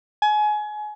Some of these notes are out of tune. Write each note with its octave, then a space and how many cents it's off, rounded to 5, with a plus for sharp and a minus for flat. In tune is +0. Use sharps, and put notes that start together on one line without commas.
G#5 +25